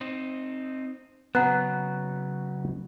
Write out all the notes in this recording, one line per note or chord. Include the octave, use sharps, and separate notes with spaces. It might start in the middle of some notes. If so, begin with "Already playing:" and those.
C4 D#4
C#3 F#3 B3 F#5 A#5 F#6